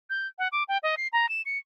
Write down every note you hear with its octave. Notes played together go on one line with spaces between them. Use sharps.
G6
F#5
D6
G5
D#5
C7
A#5
E7
C#7